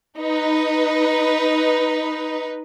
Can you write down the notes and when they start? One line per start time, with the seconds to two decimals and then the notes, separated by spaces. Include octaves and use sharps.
0.19 D#4 B4